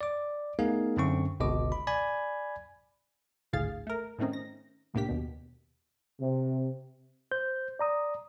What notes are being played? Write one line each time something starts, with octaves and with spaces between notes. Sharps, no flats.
D5 D6
A3 B3 D#4 G#4 A#4 F5
F#2 D3 C4 C#6
G1 C#2 B2 D#5 D6
B5
D5 G#5 B5 G#6
G#1 D2 A2 G#4 F5 A6
A3 A#4
A2 D#3 A3 C4 C#4 D#4
A#6
C2 A2 A#3 D4 G4 B6
D#2 B2
C3
C5 G6
D5 A#5 D#6